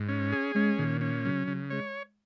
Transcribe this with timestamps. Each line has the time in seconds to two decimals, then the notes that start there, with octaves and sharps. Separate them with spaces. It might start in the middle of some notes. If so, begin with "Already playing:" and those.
Already playing: G#2
0.09 C#4
0.32 G#4
0.55 G#3 C#4
0.78 A#2 D#3
1.01 C#4
1.25 C#3 F#3
1.47 C#3
1.70 G#3 C#5